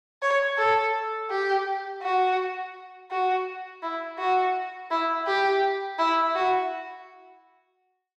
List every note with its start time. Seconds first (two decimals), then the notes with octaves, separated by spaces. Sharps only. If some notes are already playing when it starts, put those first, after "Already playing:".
0.22 C#5
0.58 A4
1.30 G4
2.02 F#4
3.11 F#4
3.83 E4
4.19 F#4
4.91 E4
5.27 G4
5.99 E4
6.35 F#4